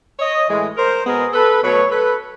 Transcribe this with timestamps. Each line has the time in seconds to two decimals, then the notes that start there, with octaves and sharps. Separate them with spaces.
0.19 C#5 D#5
0.48 A2 E3 G#3
0.76 A#4 C5
1.05 B2 G#3 B3 G#4 A#4
1.33 A4 B4
1.62 B2 F#3 A3 B4 C#5
1.90 A4 B4